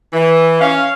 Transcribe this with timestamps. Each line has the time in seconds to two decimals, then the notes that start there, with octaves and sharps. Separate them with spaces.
0.13 E3
0.60 C#4 C#5 F5